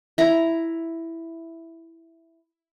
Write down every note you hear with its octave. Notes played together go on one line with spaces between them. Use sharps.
E4 A#5